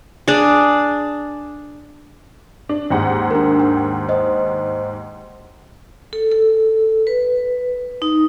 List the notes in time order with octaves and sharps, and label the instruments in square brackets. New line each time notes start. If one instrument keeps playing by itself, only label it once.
[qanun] D4 G#4
[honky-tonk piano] D4
D#2 G#2 F#5
[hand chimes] D4 A#4
G5
C5 D#5
[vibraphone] A4
A4
B4
D#4